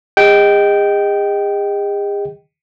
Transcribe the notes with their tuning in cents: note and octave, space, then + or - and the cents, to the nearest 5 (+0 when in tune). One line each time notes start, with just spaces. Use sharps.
G#4 -40 D#5 +0 G5 -15